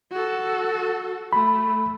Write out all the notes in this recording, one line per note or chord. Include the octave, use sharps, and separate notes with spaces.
F#4 A4
A3 B5